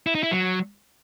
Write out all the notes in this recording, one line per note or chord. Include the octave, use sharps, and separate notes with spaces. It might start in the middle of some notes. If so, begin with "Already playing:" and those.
E4
D#4
E4
F#3